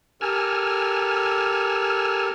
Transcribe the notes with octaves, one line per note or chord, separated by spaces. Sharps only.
G4 A4 A#4 G#5 E6 F6